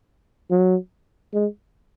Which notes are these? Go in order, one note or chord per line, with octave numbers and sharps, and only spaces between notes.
F#3
G#3